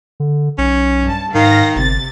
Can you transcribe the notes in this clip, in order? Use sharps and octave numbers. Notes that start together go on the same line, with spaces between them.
D3
B1 C#4
G2 A5
G#2 D#3 F5 A#6
G1 C3 A6